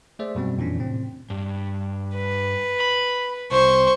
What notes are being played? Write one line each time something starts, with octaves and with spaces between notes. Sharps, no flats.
A3 G#4 C5 D5 E5
F#2 B2 G3 C4
F2 A#2 E3 C#4 D4
A2 C3 C4
G2
B4
B5
C2 C5 C#6